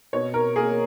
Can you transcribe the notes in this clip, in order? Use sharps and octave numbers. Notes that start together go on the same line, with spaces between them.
B2 C#5
A#4
A#3 G#4